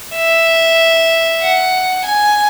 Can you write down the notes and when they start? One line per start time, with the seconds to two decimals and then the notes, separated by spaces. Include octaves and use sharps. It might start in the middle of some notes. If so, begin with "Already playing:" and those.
0.15 E5
1.41 F#5
2.05 G#5